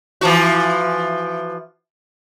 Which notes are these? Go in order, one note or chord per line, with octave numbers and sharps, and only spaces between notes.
E3 F3 F#4